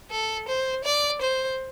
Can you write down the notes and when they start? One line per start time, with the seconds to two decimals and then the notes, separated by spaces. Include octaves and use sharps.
0.11 A4
0.48 C5
0.84 D5
1.22 C5